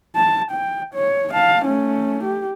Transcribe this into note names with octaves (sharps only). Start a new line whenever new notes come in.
A5
G5
C#5
F5 A5
A3 C#4
G4